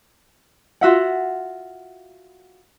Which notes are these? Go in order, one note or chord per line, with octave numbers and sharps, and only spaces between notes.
F4 F#4 E5 F#5